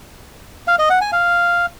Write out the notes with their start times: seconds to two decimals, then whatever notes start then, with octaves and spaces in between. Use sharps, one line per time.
0.68 F5
0.79 D#5
0.90 F#5
1.01 G#5
1.12 F5